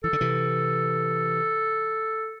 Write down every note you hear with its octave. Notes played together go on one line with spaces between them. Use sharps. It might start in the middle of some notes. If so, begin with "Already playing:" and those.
E3 A4
D3
C3 E3